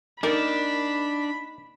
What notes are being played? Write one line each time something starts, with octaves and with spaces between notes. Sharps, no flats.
A#3 D4 D#4 A#4 D5 B5